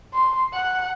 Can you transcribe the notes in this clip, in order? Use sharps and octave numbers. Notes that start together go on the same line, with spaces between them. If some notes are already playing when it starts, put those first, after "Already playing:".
C6
F#5